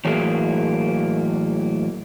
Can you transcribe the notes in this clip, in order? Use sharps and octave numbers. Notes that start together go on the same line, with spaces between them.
A2 E3 F#3 A#3 G#4